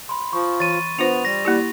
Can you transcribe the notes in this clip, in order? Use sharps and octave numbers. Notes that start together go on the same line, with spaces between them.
B5 C6
F3 C#6
E3 A6 D#7
B3 D4 F4 C5 F7
G3 A#6
A#3 E4 G4